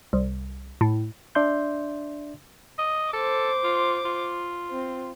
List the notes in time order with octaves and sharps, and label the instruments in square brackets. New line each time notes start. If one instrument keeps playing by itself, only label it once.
[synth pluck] C2
A2
[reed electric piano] D4 D5 E5 C6 G6
[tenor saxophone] D#5
[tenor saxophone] A4 [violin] C5 D6
[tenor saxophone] F4
F4
[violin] C4